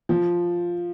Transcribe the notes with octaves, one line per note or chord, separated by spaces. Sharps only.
F3